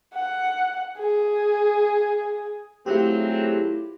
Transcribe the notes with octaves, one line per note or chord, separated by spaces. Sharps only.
F#5
G#4
F#3 A3 C4 E4 F4 G4 G#4